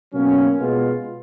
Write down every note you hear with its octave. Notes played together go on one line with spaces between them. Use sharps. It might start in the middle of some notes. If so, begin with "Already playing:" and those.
B2 F#3 A#3 C#4
B2 G#3 B3 F4